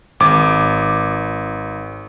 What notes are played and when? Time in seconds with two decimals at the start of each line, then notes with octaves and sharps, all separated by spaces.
0.20 G#1 D6